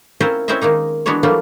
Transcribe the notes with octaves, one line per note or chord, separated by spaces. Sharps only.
C4 C#4 E4 F4 A#4 C5
C4 C#4 E4 C5 D#5 E5
D#3 G#3 A#3 D#4
E3 G#3 B3 D4 F#4 C#5
E3 F#3 G3 A3 A#3 F4